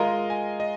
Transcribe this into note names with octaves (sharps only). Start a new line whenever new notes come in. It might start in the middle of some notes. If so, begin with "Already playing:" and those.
Already playing: G#3 F4 A#4 D#5
G#5
D#5